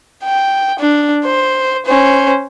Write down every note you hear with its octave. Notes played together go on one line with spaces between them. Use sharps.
G5
D4
C5
C#4 C5